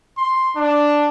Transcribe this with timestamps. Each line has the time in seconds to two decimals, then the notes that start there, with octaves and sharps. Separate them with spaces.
0.17 C6
0.56 D4